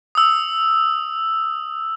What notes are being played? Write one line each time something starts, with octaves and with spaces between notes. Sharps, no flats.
D#6 E6